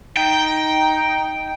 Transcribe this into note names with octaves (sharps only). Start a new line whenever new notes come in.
D#4 G5